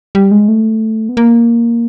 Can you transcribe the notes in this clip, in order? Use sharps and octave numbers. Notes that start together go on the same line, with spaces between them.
G3
G#3
A3
B3
A#3